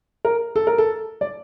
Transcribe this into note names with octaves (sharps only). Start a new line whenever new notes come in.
A#4
A4
A#4
A4
D5